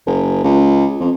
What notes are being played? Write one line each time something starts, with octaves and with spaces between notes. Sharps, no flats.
F#1
C#2
F2